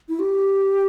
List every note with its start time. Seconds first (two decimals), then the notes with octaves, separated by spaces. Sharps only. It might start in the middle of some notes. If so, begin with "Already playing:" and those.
0.09 E4
0.19 G4